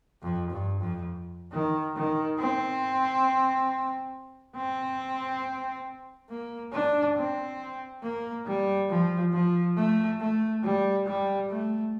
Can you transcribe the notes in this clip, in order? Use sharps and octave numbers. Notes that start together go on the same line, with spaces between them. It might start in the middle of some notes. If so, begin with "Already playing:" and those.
F2
G2
F2
D#3
D#3
C4
C4
A#3
D4
C4
A#3
G3
F3
F3
A3
A3
G3
G3
A3